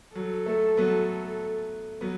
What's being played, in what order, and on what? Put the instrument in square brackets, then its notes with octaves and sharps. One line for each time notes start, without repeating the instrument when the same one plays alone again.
[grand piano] F#3 [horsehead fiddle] A4
[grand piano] A3
F#3 B3
F#3 B3